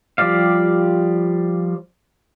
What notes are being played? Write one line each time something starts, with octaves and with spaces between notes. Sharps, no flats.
F3 G3 G4 D5 F5